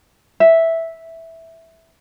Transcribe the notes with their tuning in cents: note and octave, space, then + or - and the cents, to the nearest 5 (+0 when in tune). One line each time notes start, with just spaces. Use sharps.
E5 -5